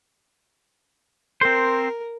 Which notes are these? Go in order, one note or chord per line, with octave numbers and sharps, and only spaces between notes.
C4 A#4 C5